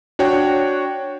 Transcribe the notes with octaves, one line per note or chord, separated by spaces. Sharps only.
D4 F#4 C#5 G5